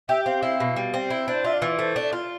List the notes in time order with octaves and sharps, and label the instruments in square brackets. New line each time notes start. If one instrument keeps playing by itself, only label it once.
[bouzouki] G4 [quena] E5
[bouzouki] C4 [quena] F5
[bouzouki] E4
B2
G3
C4
E4
[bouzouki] D4 [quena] C5
[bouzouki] F4 [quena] E5
[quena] D5
[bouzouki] E3
[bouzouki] A3 [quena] C5
[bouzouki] D4
F4